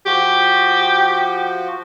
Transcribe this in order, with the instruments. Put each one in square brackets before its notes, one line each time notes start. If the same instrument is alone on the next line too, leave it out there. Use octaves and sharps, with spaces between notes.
[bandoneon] F3 F#4 [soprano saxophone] G4